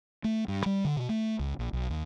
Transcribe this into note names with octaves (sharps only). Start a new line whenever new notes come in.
A3
G2
G3
D3
B2
A3
C#2
A#1
B1
D#2